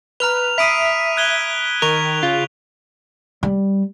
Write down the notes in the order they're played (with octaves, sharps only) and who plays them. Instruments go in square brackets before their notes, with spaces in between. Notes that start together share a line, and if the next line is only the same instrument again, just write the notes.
[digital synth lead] B4 [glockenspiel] A#5 F6 G7 [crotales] F7
[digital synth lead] E5 [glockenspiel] B5 D#6 C7 [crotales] B6 D7 D#7
[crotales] F#6 G#6 G7
[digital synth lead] D#3 [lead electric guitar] A#4 [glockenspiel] C#6 [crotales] F7
[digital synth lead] C#3 [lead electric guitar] F4
[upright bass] G3